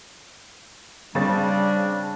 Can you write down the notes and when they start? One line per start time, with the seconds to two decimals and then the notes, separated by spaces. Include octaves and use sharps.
1.15 C#3 G3 C4 D4 A6